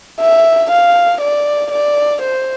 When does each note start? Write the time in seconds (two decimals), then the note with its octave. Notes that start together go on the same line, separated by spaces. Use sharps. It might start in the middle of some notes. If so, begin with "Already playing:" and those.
0.20 E5
0.71 F5
1.21 D5
1.71 D5
2.22 C5